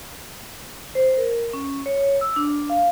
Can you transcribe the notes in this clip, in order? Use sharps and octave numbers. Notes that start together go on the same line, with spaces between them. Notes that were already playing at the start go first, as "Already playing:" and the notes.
C5
A#4
C#4
C#5
E6
D4
F5